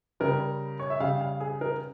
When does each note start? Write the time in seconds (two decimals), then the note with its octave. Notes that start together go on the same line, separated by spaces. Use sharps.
0.20 C#3 G3 A#4
0.80 C#5
0.90 E5
1.00 C#3 G3 F5
1.21 F5
1.40 G#4
1.61 A#4